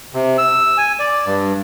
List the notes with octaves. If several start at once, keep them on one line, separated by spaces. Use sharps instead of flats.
C3
E6
G#5
D5
G2